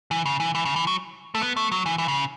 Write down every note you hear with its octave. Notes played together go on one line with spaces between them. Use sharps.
E3
C#3
E3
E3
C#3
E3
F#3
A3
B3
A3
F#3
E3
E3
C#3